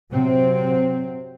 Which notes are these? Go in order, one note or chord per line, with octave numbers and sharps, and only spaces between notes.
C3 F#3 C4